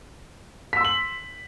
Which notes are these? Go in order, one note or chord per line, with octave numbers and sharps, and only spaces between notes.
C6 E6 B6 F#7